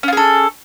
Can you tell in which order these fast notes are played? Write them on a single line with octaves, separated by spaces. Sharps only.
C#4 F4 G#4 A4